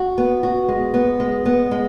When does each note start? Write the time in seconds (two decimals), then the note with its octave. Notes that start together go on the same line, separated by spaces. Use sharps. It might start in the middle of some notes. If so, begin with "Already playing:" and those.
Already playing: F#4
0.18 B3
0.43 F#4
0.68 G#3
0.94 B3
1.20 G#3
1.45 B3
1.71 G#3